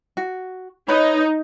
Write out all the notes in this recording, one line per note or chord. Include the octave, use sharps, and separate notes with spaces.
F#4
D#4 B4 C#5 B5